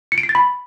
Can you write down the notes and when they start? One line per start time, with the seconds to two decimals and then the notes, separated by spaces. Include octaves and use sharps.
0.12 C#7
0.18 D7
0.23 C7
0.29 A6
0.35 B5